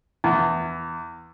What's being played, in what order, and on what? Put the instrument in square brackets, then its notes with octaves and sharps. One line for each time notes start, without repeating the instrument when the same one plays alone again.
[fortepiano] E2